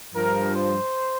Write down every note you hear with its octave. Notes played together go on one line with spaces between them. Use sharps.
G2 F3 A#4
C5